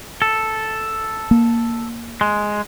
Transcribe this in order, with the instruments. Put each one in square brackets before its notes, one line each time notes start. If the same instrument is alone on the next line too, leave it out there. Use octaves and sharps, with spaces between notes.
[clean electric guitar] A4
[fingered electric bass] A#3
[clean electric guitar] G#3